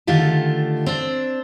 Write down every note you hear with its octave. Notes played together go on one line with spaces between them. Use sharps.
D3 D#3 A3 F4 G4
C4 D4